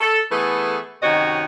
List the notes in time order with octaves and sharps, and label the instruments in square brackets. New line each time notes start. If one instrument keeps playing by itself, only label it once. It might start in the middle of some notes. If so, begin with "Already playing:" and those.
[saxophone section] A4
E3 A3 B3 G#4 A4 B4
F#2 C3 D#3 F#4 C#5 D#5